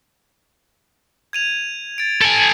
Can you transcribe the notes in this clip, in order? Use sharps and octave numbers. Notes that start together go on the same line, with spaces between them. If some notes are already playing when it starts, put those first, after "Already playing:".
G#6 D#7 F7
A6 D7
A4 G#5 G#6 C#7 D7